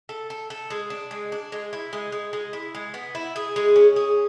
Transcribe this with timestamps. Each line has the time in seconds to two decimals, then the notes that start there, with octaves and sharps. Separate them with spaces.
0.09 A4
0.30 A4
0.50 A4
0.70 G#3
0.90 D4
1.11 G#3
1.32 D4
1.52 G#3
1.73 E4
1.93 G#3
2.12 G#3
2.33 G#3
2.53 E4
2.75 G#3
2.94 B3
3.15 E4
3.36 G#4
3.56 G#3
3.76 C#4
3.96 G#4